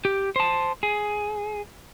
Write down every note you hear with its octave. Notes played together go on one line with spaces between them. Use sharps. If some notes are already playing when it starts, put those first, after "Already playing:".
G4
C5 A5
G#4